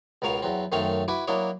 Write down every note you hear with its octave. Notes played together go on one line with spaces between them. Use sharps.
C#2 B2 A#4 C#5 F5
E2 F#3 C4
F#2 D#3 A3 C4 C#5 F5
E4 F#4 B4 G#5 B5 D6
F#3 A#3 D4 E4 C#5 D#5